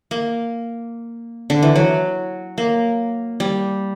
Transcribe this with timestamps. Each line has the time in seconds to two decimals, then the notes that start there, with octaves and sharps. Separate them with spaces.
0.11 A#3
1.50 D3
1.63 E3
1.76 F#3
2.58 A#3
3.40 G3